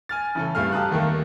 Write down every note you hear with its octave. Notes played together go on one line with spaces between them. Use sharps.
G#5 F6 A6
A1 C#3 A4
C2 G2 A3 F5 F6
G4 F5 A5 A#5 D#6 F#6
D#2 D#3 A3 A#3